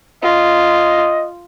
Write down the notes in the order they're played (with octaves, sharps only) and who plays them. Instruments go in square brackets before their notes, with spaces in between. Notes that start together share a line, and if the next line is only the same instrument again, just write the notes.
[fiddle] F4 [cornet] D#5